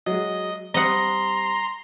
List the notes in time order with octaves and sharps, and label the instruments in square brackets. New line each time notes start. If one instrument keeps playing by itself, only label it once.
[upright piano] F#3 G#3 [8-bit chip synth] D#5
[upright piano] G3 C4 [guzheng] D#5 F#5 [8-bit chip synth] A#5 C6